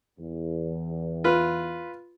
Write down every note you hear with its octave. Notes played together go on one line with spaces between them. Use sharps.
E2
F4 B4